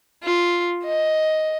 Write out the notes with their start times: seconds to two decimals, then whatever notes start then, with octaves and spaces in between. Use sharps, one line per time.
0.23 F4
0.84 D#5